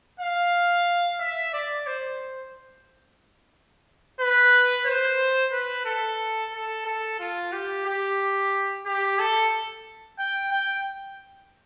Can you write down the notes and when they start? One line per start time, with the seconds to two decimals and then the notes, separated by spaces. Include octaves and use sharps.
0.20 F5
1.20 E5
1.53 D5
1.87 C5
4.20 B4
4.86 C5
5.52 B4
5.85 A4
6.53 A4
6.85 A4
7.19 F4
7.52 G4
7.86 G4
8.86 G4
9.19 A4
10.19 G5
10.52 G5